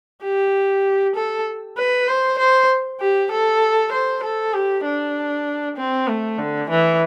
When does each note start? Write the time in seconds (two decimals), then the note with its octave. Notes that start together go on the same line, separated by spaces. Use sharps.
0.24 G4
1.15 A4
1.78 B4
2.09 C5
2.39 C5
3.00 G4
3.32 A4
3.92 C5
4.24 A4
4.54 G4
4.85 D4
5.77 C4
6.08 A3
6.39 D3
6.70 E3